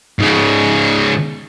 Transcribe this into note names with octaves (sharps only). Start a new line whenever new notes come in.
G#2 C#3